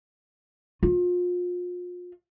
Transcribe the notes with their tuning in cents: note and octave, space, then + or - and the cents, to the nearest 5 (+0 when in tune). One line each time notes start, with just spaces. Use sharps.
F4 +35